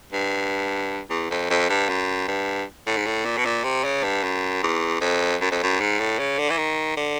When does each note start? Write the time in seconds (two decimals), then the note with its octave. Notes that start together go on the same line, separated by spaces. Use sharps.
0.12 G2
1.10 E2
1.30 F2
1.50 F2
1.69 G2
1.89 F#2
2.28 G2
2.87 A2
2.97 G#2
3.06 A2
3.25 A#2
3.37 B2
3.45 A#2
3.64 C3
3.84 C#3
4.03 G2
4.23 F#2
4.63 E2
5.01 F2
5.41 F#2
5.51 F2
5.63 F#2
5.80 G#2
5.99 A2
6.19 C#3
6.38 D3
6.50 E3
6.58 D#3
6.97 D3